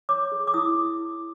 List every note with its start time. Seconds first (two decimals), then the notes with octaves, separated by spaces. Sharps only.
0.09 C#5 D6
0.32 G#4
0.47 D6
0.54 E4 D#6
0.75 E4